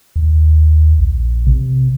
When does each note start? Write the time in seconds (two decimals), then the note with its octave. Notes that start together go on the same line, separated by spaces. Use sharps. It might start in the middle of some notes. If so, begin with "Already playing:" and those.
0.16 D#2
0.99 A#1
1.47 C3